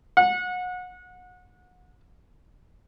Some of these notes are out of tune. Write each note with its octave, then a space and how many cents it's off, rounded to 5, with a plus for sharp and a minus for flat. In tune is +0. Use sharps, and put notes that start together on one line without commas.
F#5 -30